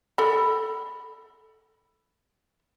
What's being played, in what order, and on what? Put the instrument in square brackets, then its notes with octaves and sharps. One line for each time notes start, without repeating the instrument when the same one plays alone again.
[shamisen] A4 B5